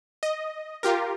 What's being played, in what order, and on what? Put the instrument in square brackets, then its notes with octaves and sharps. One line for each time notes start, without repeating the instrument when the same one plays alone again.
[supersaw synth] D#5
F4 G4 A#4